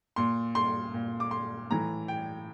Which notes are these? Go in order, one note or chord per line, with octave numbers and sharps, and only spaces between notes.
A#2 C6
C6
A#2
D6
C6
A2 E3 A#5
G5